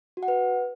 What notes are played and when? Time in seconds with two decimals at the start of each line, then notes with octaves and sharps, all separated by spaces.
0.17 F#4
0.23 F#5
0.28 B4